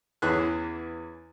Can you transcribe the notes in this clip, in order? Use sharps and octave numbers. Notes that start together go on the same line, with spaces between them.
E2 E3 C#4 E4 G#4 F#6